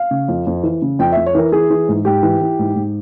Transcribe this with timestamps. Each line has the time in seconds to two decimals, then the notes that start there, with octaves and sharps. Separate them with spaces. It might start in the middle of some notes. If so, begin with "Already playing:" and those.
Already playing: F5
0.11 C#3
0.28 F2
0.47 F2
0.63 E3
0.82 C#3
0.99 F2 G5
1.12 E5
1.16 F2
1.26 C#5
1.35 E3 A#4
1.52 E3 G#4
1.70 E3
1.88 G#2
2.05 G#2 G4
2.23 E3
2.41 E3
2.59 G#2
2.76 G#2